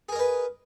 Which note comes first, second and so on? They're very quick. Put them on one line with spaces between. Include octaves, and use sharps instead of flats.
G#4 A#4 D#5 B4